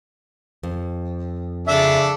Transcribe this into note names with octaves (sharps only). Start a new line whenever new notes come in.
F2
C#3 D4 A4 E5